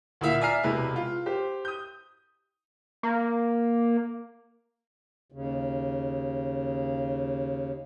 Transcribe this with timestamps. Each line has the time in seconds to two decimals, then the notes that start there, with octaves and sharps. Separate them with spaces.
0.21 D2 A#2 E4 E5 F5
0.41 D5 E5 G#5 A#5 F6 C7
0.63 E1 C3 G#3 E4 B4
0.96 F4
1.26 G4 C5
1.65 D#6 G6
3.03 A#3
5.32 D#2 C#3